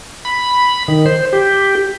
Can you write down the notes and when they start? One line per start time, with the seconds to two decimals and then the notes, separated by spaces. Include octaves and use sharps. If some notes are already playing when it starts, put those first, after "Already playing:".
0.25 B5
0.88 D#3
1.06 C5
1.33 G4